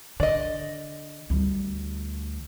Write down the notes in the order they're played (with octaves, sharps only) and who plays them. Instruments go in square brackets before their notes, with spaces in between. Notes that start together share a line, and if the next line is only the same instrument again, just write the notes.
[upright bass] D3 [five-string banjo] D5 D#5
[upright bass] D2 G3